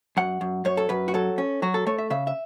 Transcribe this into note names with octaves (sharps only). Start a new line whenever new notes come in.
F#2 F#5
F#2
F#2 C#5
A4
F#2 B4
F#4
F#3 A4
C#4
F#3 F#4
A4
A3 C#5
E5
C#3 E5
E5